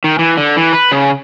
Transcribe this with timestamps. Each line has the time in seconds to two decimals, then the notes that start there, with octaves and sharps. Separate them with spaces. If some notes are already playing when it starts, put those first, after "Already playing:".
0.04 D#3
0.19 E3
0.37 D3
0.57 E3
0.73 B4
0.92 C#3